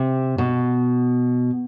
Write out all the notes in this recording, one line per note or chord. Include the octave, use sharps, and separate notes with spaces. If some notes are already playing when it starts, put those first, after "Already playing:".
Already playing: C3
B2